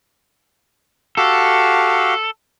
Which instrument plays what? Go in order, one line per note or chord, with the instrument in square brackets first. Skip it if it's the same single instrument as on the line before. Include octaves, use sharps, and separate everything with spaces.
[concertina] F#4 G4 F5 [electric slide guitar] A4